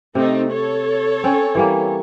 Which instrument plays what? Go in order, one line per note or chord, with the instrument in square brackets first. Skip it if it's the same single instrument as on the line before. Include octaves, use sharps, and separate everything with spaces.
[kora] C3 [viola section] A3 C4 D#4
[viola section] A4 C#5
[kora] C4 C#4 C5
E3 G3 A#3